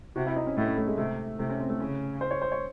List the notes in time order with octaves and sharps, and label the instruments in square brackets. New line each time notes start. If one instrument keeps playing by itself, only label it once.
[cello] C3 [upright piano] F#4
[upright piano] E4
D#4
C#4
[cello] A2 [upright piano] A3
[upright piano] C#4
A3
G#3
[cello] C3 [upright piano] A3
[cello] C3 [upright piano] A3
[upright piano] C#4
C4
A3
[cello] C#3 [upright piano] C#4
[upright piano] C5
C#5
C5
C#5